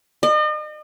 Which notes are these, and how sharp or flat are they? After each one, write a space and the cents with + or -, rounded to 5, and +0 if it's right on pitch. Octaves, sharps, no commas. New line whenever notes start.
D#5 -40